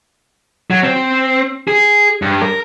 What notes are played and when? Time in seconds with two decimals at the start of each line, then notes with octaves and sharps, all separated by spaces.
0.70 F#3
0.84 C4
1.68 G#4
2.22 G2
2.42 A#4